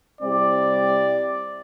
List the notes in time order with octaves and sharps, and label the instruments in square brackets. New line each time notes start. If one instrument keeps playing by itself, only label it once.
[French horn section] C3 G3 C4 E4 G4 [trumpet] D5